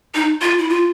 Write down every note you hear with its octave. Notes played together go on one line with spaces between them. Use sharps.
D#4
F4
E4
F4